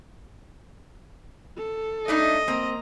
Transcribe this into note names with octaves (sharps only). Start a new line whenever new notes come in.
A4
A3 D4 D#4 D#5
A#3 C4 A#5